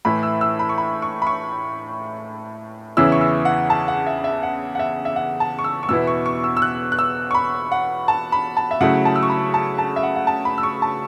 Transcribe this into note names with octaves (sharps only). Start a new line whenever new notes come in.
A2 E3 A3 E4 B5
E6
E6
B5
C#6
B5
C#6
B5
C#6
E2 C#3 E3 C#4 E4 E6
C#6
E6
F#5
A5
F#5
E5
E5
F#5
F#5
E5
E5
F#5
A5
C#6
E6
C#6
E2 B2 B3 E4 E6
C#6
C#6
E6
E6
F#6
F#6
E6
C#6
B5
F#5
A5
B5
A5
E5
C#3 F#3 A3 E4 F#5
A5
E6
C#6
B5
A5
A5
E5
F#5
F#5
A5
B5
E6
C#6
A5